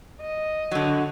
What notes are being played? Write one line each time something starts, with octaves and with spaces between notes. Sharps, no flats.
D#5
D3 F#3